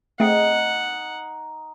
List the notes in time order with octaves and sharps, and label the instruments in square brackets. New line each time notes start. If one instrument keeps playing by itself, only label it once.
[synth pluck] A3 C4 G#4 [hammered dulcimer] D#4 [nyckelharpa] F#5